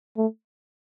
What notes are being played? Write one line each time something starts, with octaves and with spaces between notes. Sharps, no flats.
A3